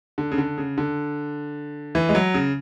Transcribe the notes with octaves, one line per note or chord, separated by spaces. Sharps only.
D3
C#3
D3
C#3
D3
E3
G#3
F#3
C#3